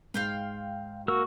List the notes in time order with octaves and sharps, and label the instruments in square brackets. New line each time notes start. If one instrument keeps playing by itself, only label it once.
[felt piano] G#2 [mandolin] F5 G5 C6
[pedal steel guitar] A#3 A#4 E6 [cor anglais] F#4